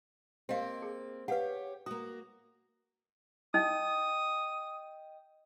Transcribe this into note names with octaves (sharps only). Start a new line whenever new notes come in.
A#3 C4 G4 D#5 F5
G#4
G4 B4 C#5 F5 F#5
A#3 F#4 D#6
D#4 D#5 G5 D#6 G6